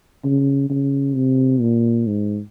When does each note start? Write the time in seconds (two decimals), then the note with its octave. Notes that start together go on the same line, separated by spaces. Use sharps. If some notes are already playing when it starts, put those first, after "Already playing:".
0.24 C#3
0.70 C#3
1.16 C3
1.61 A#2
2.07 G#2